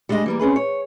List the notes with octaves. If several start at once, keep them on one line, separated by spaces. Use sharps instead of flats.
G3 G#3 D4 E4 D#5
E3 G3 A#3
C4 C#4 G#4 B4
C#5